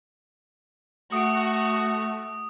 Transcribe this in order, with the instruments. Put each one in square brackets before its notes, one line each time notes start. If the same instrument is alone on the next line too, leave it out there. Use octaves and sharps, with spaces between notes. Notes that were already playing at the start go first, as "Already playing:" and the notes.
[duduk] A3 [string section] F#4 [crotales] D#6 D7